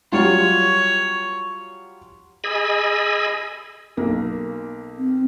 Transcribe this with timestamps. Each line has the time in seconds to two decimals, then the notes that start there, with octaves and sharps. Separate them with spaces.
0.12 F#3 G3 F4 C#5
2.44 G#4 D#5 G#5 B5 E6
3.97 B1 A#3
4.97 C4